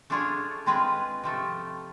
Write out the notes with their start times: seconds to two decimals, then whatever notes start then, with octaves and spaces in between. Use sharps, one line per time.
0.10 A3 D4 F4 G#4 C#5
0.66 G#3 C4 F4 G#4 B4
1.24 C3 F3 A3